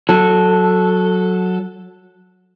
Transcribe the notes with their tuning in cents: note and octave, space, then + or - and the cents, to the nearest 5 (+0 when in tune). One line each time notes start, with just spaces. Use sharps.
F#3 -10 A4 +0